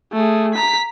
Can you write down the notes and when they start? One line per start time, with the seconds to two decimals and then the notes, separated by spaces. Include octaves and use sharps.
0.13 A3 G#4
0.54 A#5 B6